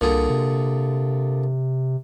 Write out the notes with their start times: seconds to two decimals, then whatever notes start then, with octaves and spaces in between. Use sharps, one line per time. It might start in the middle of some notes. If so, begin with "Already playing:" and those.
0.01 C2 A#2 D3 G#4
0.30 C3